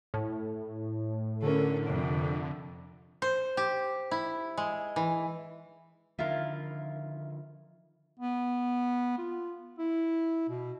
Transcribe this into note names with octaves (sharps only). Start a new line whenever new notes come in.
A2
D3 C#4 A4 A#4
F2 C3
C5
G4
E4
G#3
E3
D3 D#3 F3 E4 F4 A#4
B3
F4
E4
B2